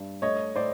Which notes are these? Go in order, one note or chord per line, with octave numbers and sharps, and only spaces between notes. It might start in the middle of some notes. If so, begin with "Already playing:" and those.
Already playing: G2
A3 C#5 D#5
A2 C5 D5